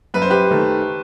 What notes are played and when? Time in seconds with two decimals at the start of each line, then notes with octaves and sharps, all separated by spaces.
0.14 F#2 B4
0.22 C5
0.30 G4 B4
0.51 D#3 A3